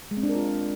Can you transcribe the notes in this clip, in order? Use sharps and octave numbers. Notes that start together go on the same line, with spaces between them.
G#3
C4
D4
A#4
F4